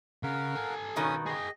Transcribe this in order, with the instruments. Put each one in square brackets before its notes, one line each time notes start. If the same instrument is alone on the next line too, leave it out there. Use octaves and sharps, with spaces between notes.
[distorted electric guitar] C#3 [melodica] A#4 F5 F#5
[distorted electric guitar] A4 G#5
[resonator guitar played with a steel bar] G2 B2 D#3 [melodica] C#4 D#6
[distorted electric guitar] G#4 G5 [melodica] D#5